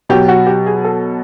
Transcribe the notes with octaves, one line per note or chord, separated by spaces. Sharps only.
B2 F#3 G4
F#4
G4
G#4
A4